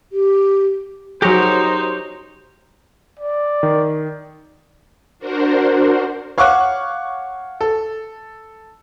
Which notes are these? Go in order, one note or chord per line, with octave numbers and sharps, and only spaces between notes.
G4
F#3 D#4 G4 G#4 A#4 C5 C#5
D5
D#3
D4 F#4 A#4 C5
C#5 F5 F#5 C#6 D6 F#6
A4